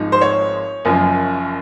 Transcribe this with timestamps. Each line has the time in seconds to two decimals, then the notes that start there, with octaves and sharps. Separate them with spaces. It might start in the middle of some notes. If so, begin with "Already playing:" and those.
Already playing: G#1 G#2 F3 D#4
0.12 C5
0.21 C#5
0.85 F#1 F#2 F3